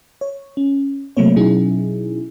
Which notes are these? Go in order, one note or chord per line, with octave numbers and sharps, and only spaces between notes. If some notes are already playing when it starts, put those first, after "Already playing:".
C#5
C#4
C3 F#3 A3 A#3 C4 C#5
B2 F#3 C#4 D#4 E4 G#4